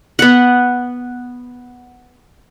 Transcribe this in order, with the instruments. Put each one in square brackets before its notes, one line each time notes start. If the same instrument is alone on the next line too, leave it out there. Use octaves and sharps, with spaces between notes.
[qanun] B3 F#5